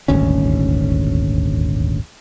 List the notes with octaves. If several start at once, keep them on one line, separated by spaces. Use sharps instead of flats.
D#1 G#1 D2 C#4